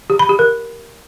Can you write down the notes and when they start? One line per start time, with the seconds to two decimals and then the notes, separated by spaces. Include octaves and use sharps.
0.10 G4
0.19 B5
0.29 G4
0.39 A#4